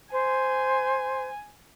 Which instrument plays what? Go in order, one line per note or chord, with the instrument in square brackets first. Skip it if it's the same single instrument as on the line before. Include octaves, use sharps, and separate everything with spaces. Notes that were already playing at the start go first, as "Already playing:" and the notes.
[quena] C5 [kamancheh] G#5